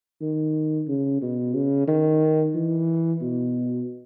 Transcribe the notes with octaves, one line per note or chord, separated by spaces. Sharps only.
D#3
C#3
B2
C#3
D#3
E3
B2